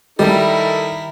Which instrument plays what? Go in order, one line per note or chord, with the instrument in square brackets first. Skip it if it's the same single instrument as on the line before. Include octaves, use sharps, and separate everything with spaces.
[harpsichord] D#3 [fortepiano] G3 [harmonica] D#4 A4 [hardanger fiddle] E4 A#4